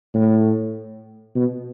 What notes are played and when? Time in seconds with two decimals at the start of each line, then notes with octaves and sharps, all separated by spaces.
0.14 A2
1.35 B2